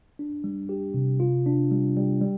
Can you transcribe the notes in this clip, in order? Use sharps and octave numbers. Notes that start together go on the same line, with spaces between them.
D4
G3
G4
C3
F4
D4
G3
G3
G3